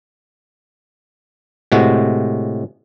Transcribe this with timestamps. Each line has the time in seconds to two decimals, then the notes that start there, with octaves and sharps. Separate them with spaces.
1.72 A2 C3 G#3 F#4